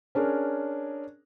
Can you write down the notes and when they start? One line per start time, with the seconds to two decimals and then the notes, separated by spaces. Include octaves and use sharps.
0.15 C#4 D4 G#4 A#4